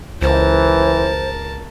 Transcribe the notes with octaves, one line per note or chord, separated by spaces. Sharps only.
C#2 E3 A#4 C5 A5